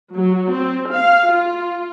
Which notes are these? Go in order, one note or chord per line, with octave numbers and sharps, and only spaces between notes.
F#3
C4
F5
F4